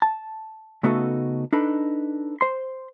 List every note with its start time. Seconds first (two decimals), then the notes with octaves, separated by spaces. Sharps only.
0.02 A5
0.83 C#3 A3 B3 D#4 F#4 A4
1.53 D4 D#4 A4 B4
2.41 C5 C6